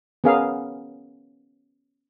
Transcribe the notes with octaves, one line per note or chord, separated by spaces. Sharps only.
B3 C#4 G#4 A#4 F5